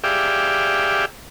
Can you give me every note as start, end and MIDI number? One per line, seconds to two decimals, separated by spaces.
0.04 1.05 67
0.04 1.05 68
0.04 1.05 74
0.04 1.05 76
0.04 1.05 77
0.04 1.05 79